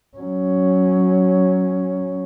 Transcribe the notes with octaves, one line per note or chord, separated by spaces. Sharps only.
F#3 C#4